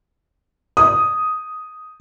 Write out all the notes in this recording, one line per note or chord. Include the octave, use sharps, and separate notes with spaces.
D#6